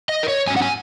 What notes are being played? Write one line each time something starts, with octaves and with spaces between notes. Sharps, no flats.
D#5
A#4
C#5
G#2 F#3 C#4 G#5
F#5
G#5